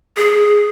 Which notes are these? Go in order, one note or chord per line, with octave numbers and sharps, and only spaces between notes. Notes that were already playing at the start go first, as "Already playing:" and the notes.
G#4